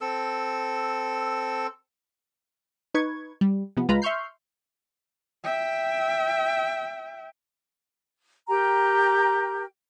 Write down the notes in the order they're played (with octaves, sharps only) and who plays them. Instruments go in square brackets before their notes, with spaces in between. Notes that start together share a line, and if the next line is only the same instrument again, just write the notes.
[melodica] C4 A4 E6
[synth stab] D#4 B4 C#6 G#6
G3
C3 F3 B3
C#2 G#3 F4 B4 A#5 B5
E5 C6 C#6 F6 G6 C7
[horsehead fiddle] E5 G5
[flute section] G4 A#4 G5 A#5